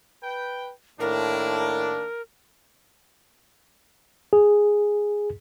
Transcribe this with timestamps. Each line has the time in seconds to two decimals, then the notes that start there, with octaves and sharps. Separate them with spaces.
0.23 B4 G5
1.00 A2 D#3 A#3 D4 A#4
4.33 G#4